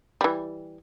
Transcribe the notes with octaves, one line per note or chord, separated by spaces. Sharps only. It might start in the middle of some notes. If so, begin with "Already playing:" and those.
E3 G3